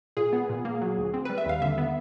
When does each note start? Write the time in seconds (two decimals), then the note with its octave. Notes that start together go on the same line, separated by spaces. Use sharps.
0.17 A#2 G#4
0.33 B3
0.49 A#2
0.65 A#3
0.82 F#3
0.97 D2
1.14 C4
1.25 G3 B4
1.38 E5
1.45 D#2 F5
1.62 D3 E5
1.78 B3